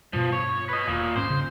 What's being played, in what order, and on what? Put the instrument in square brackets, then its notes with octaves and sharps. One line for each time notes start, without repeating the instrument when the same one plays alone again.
[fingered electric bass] G2 B2 [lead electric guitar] F3
[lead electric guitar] C#5
B4 D#5
[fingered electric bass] E1 D#2 [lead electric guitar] A#2
[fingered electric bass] G#2 C#4 [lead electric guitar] C5
[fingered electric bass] C#3